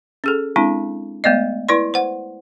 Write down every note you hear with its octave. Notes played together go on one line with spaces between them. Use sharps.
C#4 G#4 A4
G#3 C4 D4 E4
G#3 A3 B3 D5 D#5
E4 B4 D5 C6
C5 F#5